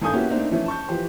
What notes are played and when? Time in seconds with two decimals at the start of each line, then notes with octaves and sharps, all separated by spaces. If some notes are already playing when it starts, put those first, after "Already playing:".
0.02 G#1 G2 A4 G#5 D#6 G6
0.14 A#3 B3 C#4 E4 F#4 G4
0.30 A3 A#3 C4 D4 D#4
0.51 E3 F3 A3 C#4 E4 F4
0.66 A5 C#6 G6
0.88 E3 F3 G4 C5